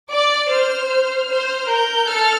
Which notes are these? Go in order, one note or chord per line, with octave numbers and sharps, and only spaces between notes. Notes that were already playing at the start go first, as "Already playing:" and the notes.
D5 D6
C5 F6
F6
C5
A#4 G6
A4 F6